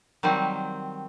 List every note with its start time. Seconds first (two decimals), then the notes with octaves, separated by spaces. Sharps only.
0.23 D#3 F#3 G3 C4